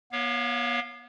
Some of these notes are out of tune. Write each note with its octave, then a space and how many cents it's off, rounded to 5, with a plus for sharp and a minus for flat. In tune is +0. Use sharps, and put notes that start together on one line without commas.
B3 -35 C#5 +0 F5 +0